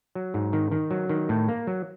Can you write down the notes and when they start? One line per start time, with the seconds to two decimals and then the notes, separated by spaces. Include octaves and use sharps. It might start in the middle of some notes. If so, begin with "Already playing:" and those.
0.15 F#3
0.34 G#2
0.53 D#3
0.71 D#3
0.91 F#3
1.09 D#3
1.29 A2
1.48 A#3
1.67 F#3